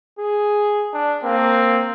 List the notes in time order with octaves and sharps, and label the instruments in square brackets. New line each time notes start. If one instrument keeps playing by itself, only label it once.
[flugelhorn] G#4
[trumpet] D4
[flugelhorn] A#3 [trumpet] C4